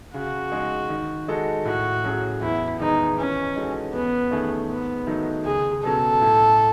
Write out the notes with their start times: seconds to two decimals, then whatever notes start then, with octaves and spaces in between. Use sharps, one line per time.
0.14 C#3 F#4
0.52 G#3 D#4
0.90 D#3
1.28 G#3 D#4 F#4 A4
1.65 A2 F#4
2.04 F#3 C#4 G#4
2.41 E2 E4
2.79 D#3 G#3 B3 D#4
3.18 E3 C#4
3.56 G#3 D#4 F#4 A4
3.93 E2 B3
4.31 D#3 A3 C#4 G#4
4.69 G#2 B3
5.07 D#3 F#3 A3 D#4
5.45 C#2 G#4
5.83 B2 F#3 C#4 A4
6.22 A2